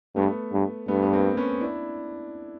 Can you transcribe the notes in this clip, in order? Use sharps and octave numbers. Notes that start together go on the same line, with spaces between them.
G2 A3 B3
G2
G2 A3 B3
B3
A#3 C4
B3 C#4
D4 E4